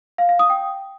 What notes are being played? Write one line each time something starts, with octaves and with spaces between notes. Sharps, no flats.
F5
F5
D#6
G5